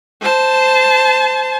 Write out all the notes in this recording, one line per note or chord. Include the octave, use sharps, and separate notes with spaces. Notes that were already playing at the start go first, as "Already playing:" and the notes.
C5 A5